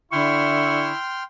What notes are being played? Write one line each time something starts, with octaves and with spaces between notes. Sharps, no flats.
D3 E4 G5 C6 C#6 F6